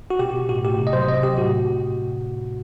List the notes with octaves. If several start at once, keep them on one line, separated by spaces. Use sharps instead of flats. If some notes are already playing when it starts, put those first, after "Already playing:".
F#4
B2 G4
B2
A2 F#4
A2 G4
C3
D#5
F#3 C5
C3 D#5
C3 G4
A2 F#4